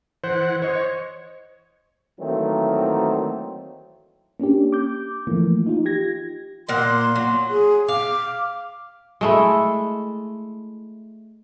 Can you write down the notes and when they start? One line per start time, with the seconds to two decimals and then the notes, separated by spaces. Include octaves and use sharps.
0.24 E3 C5 F#5
0.62 C5 C#5 D#5
2.20 D#3 E3 F#3 A3 A#3 C4
4.40 A#3 C#4 D4 G4
4.73 D6 G6
5.27 E3 F3 A3 A#3
5.66 D#4 F4
5.85 G4 G#6 A#6
6.69 A#2 A#3 F#5 C6
7.15 F#3
7.50 G#4
7.88 F5 D6
9.21 G#3 A3 E4